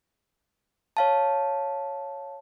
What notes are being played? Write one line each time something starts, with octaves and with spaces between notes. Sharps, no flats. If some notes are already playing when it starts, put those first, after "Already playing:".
C#5 F5 A5